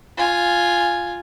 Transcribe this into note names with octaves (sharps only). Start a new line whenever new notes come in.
F4 G#5